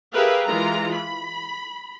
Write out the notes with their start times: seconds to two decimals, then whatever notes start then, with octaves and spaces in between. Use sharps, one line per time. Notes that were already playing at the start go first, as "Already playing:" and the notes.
0.14 G4 G#4 A#4 B4 E5 F5
0.46 E3 G#3 F4 A#5
0.96 B5